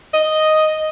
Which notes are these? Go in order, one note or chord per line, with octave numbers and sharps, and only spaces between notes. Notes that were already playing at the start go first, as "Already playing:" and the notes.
D#5